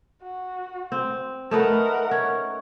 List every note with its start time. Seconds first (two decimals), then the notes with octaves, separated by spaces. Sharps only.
0.22 F#4
0.92 C4
1.51 A3 D#4 A#4 B4 F#5
2.11 C#4